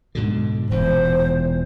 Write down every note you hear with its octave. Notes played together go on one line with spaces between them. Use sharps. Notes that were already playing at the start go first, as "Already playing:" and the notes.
G#2 B2 D3
E1 E2 A#2 C5